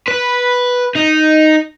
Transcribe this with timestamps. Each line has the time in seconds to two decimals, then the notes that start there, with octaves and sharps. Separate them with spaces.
0.08 B4
0.96 D#4